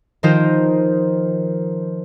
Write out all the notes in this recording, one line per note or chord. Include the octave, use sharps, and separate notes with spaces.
D#3 F3 D#4 F4 A#4 C5